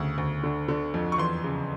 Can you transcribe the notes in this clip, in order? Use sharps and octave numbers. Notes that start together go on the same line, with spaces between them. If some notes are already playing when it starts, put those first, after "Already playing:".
Already playing: D2 C#3
D2
D3
D3
F2
C#6
E2 C6
C#3